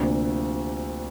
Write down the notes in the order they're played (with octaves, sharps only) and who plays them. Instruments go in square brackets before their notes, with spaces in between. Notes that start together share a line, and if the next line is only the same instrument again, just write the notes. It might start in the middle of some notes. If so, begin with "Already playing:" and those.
Already playing: [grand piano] D2 C3 F3 A#3 D4